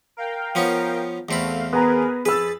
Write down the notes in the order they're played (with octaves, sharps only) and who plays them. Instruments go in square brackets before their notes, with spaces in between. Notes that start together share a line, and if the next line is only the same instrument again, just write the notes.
[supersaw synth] A#4 F5 G5
[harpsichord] F3 B3 C#4
[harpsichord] E2 C4 B5 [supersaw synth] A3 F5
[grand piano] B3 A#5 [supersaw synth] G#4 A#4 B4
[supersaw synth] F2 B5 A6 [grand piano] G#4 E6 [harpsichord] B4